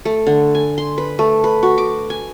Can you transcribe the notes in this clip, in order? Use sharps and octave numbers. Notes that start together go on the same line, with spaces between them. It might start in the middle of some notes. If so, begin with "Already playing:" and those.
A3
D3
G#5
C6
B4
A3
B4
F#4
D6
G#5